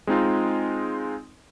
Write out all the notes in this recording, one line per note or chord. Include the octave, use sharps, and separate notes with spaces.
G#3 C4 D#4 F4